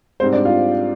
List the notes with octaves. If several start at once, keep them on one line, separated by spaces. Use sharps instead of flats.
G#2 G3 C4 C5
D4 D5
F4 F5